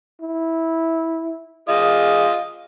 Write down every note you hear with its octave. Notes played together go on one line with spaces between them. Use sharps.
E4
F4 G#4 D#5